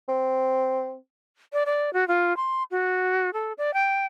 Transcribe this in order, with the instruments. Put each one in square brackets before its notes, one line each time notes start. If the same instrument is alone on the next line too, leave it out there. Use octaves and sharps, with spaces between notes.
[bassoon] C4
[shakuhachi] D5
D5
F#4
F4
C6
F#4
A4
D5
G5